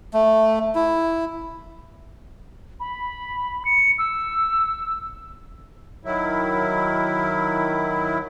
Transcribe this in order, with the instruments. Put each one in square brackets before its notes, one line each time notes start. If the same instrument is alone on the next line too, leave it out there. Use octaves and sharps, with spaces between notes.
[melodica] A3
E4
[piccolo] B5
C#7
E6
[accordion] D#3 F#3 E4